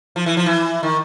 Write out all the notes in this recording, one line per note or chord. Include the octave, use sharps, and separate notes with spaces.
F3
E3
F3
E3
D#3